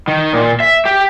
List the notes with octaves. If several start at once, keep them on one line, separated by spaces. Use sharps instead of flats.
D#3
A#2
E5
G4